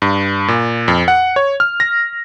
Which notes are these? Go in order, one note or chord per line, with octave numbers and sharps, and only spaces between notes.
G2
A#2
F2
F#5
C#5
F6
A#6